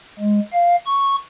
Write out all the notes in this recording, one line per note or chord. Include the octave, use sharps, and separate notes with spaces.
G#3
F5
C#6